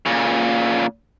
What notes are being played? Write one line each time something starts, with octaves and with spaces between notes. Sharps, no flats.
A#2 C#3